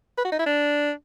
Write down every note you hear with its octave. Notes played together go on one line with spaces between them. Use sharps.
B4
F#4
D#4
E4
D4